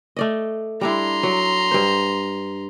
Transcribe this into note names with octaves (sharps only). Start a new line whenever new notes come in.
A3 D5 D#5
G3 D4 E4 A#5 C6
F#3
G2 C5